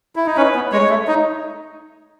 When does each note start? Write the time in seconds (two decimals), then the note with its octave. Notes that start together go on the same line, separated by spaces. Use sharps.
0.16 E4
0.26 D#4
0.37 C#4 B4
0.55 B3
0.72 G#3 C#5
0.90 A3
1.08 D#4